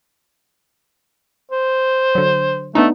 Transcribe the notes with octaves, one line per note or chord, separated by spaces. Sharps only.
C5
D3 F#3
A3 B3 D4 D#4